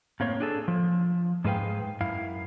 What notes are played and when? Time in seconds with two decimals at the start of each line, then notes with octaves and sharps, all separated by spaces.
0.20 A2 A#3 C4 C#5
0.40 D4 G#4 A4
0.68 F3
1.44 G#2 G#3 G#4 B4 F5 G5
2.01 F#2 E4 F5